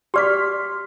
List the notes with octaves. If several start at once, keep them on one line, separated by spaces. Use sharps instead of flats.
G4 D5 C6 D6 F6 B6